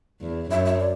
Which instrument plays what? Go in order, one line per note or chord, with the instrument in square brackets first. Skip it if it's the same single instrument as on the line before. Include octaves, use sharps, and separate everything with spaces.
[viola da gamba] E2
[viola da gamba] F#2 [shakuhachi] E5
[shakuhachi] E5
D5